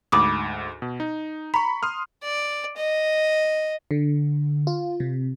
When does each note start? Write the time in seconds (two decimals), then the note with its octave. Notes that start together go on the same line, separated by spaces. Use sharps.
0.12 D2 G#2 B5 D6 D#6
0.82 B2
1.00 D#4
1.54 A#5 B5 C#6
1.83 C6 D#6 F6
2.23 D5
2.77 D#5
3.91 D3
4.67 F4
5.00 C3